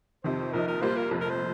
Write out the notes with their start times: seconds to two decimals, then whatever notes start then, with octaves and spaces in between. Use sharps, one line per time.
0.24 F2 C3 D#3 C5
0.53 A#1 A#2 F3 D#4 A#4
0.68 A#4
0.81 A#2 G3 A#3 F4 C5
0.97 A#4
1.11 F1 F2 F3
1.21 A#4
1.30 C5